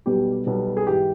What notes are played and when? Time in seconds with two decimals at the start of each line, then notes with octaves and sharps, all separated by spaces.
0.06 B1 B2 G3 B3 G4
0.46 B1 B2 G3 B3
0.77 G#4
0.87 G#2 E3 G4